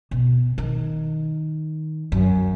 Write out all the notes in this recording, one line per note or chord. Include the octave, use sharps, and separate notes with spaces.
B2
D#3
F#2